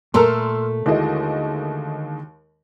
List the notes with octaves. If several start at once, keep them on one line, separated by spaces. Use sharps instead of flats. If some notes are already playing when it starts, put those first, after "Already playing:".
A#2 A3 A4 A#4 A#5 C6 E6 F6
D#2 D3 G#3 E4 F#4 D#5